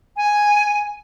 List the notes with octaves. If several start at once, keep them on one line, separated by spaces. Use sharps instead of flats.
G#5